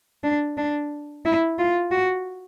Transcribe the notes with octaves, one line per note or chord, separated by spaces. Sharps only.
D4
D4
E4
F4
F#4